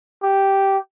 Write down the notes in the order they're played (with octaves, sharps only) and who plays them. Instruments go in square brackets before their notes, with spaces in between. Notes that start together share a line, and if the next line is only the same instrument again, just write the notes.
[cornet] G4